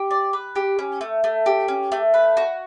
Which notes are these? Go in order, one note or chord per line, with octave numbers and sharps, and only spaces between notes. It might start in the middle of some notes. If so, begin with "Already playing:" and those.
Already playing: G4
D5
B4
G4
C#4
A3
A3
G4
C#4
A3
B4
F#4